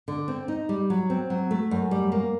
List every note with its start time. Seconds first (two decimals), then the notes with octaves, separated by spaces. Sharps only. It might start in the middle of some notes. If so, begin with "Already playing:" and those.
0.08 D3
0.28 C4
0.48 D#4
0.69 G3
0.90 F#3
1.10 C4
1.30 F#3
1.51 A3
1.71 F#2
1.91 G3
2.12 A#3